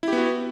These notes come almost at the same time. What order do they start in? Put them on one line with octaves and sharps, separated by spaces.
E4 G4 B3 F#4